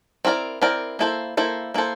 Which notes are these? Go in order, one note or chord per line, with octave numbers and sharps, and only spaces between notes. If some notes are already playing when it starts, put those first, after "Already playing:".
C4 E4 A#4 D5
C4 E4 A#4 D5
A#3 E4 A4 C5
A#3 E4 A4 C5
A#3 E4 A4 C5